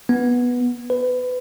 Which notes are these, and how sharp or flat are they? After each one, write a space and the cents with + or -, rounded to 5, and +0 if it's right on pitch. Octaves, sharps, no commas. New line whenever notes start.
B3 -10
B4 +25